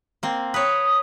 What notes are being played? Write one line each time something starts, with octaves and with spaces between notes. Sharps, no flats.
A#3 C4
B4 C#5 D#6